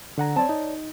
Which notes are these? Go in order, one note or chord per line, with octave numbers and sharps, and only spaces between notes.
D3 F#5 A#5
C4 C#5 D5 A5
D#4